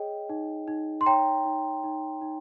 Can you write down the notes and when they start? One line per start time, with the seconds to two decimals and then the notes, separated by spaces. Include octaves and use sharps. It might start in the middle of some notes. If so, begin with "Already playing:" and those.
Already playing: G#4 C#5 D#5 G5
0.29 D#4
0.68 D#4
1.01 C6
1.06 C#5 G5 A#5
1.45 D#4
1.84 D#4
2.21 D#4